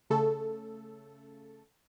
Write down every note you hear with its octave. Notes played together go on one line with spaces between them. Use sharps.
C#3 A3 A4